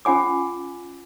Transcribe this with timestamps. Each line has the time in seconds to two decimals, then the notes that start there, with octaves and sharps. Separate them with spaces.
0.05 C#4 F4 F#5 G#5 D6